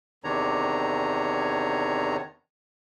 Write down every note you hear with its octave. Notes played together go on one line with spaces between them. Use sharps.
E2 C3 D#3 D4 C#5 A#5